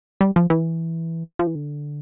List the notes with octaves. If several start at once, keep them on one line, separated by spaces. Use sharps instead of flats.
G3
F3
E3
F3
E3
D3